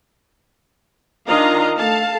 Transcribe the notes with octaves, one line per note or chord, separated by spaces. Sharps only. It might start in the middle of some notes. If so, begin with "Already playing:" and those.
D#3 D4 F4 D#5 F5 A#5
A3 A4 F5 A5